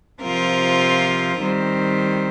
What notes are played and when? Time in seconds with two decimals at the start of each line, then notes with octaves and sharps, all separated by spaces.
0.22 C3 F3 C4 F4 A#4
1.40 D#3 G3 C4